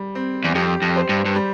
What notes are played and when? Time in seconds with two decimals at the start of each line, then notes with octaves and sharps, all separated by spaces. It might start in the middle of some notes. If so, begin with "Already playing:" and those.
Already playing: G3
0.15 C4
0.44 E2
0.55 F2 G4
0.82 F2
0.96 C5
1.09 G2
1.25 G2
1.35 G3